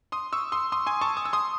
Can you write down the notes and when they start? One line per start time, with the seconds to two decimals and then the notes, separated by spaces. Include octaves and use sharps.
0.12 C6 D#6
0.33 C#6 E6
0.52 C6 D#6
0.72 C6 D#6
0.86 G#5 C6
1.01 A5 C#6
1.17 D#6
1.25 E6
1.33 C6 D#6